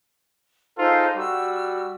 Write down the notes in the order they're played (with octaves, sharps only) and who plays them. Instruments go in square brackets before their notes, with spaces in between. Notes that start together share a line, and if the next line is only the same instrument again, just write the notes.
[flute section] D#4 C5 F5 [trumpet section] F4 G#4 A4
[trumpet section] G3 F#4 [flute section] E6